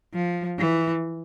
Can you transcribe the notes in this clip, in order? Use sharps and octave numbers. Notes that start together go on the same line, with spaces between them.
F3
E3